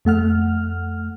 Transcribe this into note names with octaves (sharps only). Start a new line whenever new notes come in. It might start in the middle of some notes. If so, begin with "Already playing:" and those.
F2 A3 F#5 F6